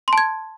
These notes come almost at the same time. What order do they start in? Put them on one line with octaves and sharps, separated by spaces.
C6 A5 G#6